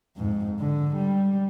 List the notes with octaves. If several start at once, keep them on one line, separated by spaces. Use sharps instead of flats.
F2 G#2
D3
G3